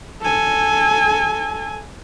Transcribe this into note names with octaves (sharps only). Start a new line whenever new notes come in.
A4 G#5